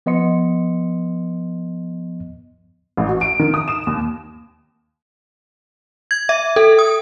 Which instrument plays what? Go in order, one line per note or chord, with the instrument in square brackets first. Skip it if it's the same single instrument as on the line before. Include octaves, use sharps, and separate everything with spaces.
[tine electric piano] F3 B3 D#5 C6 C#7
[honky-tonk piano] A1
F#4
D7
D#3
D#6
E7
D#2
[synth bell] G#6
E5
A4
D#6